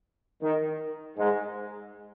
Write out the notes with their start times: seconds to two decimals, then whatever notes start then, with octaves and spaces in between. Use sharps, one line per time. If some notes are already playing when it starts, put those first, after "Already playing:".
0.42 D#3
1.18 G#2 G#3